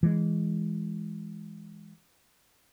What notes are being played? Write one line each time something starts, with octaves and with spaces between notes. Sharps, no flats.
E3 G#3